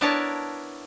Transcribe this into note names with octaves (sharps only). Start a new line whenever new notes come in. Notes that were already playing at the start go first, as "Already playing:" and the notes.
B3 D4 E4 A#4 C#5 A5